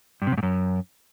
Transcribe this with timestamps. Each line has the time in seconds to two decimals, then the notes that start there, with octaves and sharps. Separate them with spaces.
0.22 G2
0.27 C3
0.32 F#2
0.37 G#2
0.43 F#2